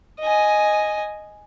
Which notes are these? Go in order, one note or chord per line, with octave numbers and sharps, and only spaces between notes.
D#5 G#5